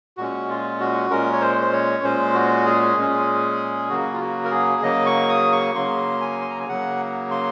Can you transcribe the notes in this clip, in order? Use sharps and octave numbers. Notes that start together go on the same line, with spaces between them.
A#2 G#3 C#4 F#4
F4
F#4
A#2 G#3 C#4 A#4
C#5
C5
C5
C#5
A#2 G#3 C#4 C5
F#4
G#4
A#2 G#3 C#4
C#3 F#3 A#3 F#4
F4
F#4
A#4
G#4
C#3 F#3 A#3 D#5
C#6
D#6
C#6
C#3 F#3 A#3 C6
G#5
C6
A#5
G#5
C#3 F#3 A#3 F#5
C6